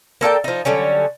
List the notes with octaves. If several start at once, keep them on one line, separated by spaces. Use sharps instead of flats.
A#3 A4 D5 G5
F3 D#4
D3 F#3 G3 C#4